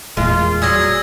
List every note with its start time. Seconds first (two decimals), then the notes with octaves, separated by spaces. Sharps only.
0.17 F1 E2 A#2 G#3 F4
0.62 F#3 G3 G#4 E6 G#6 A#6